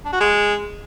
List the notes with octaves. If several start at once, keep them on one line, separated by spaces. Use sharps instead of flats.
D4
F#4
G#3